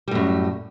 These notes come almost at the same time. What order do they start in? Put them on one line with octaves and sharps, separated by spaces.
G3 A2 F#2